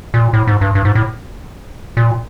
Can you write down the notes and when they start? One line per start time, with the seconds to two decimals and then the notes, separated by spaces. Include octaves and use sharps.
0.14 A#2
0.33 A2
0.47 G#2
0.61 G2
0.75 G2
0.85 G#2
0.95 A2
1.97 A#2